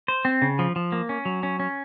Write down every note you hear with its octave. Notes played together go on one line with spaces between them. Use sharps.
C5
C4
C#3
F3
F3
A#3
C#4
F#3
C#4
C#4